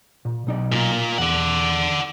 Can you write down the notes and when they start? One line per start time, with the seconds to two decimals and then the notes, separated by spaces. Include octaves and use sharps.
0.25 A#2
0.47 B1 D#4 D5
0.72 A#2 A#3
0.91 A#4
1.18 E2 D5 F#5